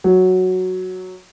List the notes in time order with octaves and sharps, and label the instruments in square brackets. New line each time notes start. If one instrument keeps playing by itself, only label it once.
[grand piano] F#3